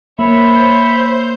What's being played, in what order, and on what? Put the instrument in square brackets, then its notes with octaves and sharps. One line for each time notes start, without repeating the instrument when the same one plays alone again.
[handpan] A#3 [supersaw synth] C5 G6 [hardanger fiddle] C#5 [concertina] E5 B5